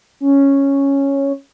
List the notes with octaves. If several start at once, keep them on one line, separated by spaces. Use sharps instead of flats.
C#4